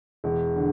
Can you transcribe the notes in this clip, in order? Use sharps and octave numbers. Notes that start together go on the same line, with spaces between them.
E1
D3